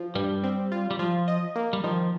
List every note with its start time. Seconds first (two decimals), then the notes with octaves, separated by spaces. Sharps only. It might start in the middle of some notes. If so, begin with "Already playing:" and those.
Already playing: F3
0.15 G2 G3
0.43 C4
0.72 F4
0.91 G3
0.99 F3 F4
1.28 D#5
1.55 A#3
1.73 G3
1.84 D#3 F3